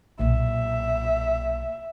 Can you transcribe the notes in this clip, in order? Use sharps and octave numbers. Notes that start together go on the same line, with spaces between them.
B1 A#2 E5